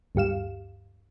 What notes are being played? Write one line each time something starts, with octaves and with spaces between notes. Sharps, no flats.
D2 G2 G4 F5 E7